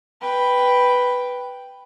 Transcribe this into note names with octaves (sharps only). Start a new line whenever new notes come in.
B4 G5